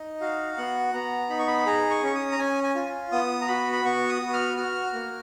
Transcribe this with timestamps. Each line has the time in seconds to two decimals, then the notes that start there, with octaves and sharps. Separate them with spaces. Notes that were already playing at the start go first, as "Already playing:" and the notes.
Already playing: D#4 D#5
0.21 F#4 F5
0.58 B3 F#5
0.94 B3 A#5
1.30 D#4 B5
1.39 C#6
1.48 B5
1.66 G#4 A#5
1.90 C#6
2.03 C#4 C#6
2.15 D#6
2.32 A#5
2.39 C#4 G#5
2.64 G#5
2.75 F4
3.12 B3 D#6
3.41 A#5
3.48 F#4 B5
3.73 B5
3.85 B3 C#6
4.09 D#6
4.22 F#4
4.33 F6
4.57 F#4 F6
4.94 A#3